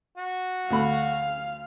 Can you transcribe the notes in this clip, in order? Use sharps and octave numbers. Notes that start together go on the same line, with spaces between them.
F#4
D2 A3 F5 B5